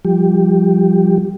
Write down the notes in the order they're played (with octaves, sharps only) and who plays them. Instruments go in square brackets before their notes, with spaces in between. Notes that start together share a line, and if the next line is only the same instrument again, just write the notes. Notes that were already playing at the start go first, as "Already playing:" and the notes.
[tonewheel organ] F3 G3 G4